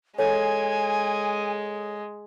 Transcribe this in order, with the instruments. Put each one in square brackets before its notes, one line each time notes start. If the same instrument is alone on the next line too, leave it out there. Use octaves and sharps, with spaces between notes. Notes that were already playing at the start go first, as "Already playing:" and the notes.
[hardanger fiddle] G#3 [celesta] A4 C#5 [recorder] G#5